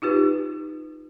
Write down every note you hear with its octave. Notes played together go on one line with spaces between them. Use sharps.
D#4 F4 G4 B4